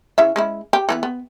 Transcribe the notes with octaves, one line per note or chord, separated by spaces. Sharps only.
C#3 E4 E5
G#3 C#4 E4
G4
E3 A#3 B3
B3